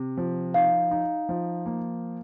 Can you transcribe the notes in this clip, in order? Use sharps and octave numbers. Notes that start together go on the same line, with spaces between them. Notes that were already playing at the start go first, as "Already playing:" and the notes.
Already playing: C3
F3
D#4 F5
D#4
F3
A#3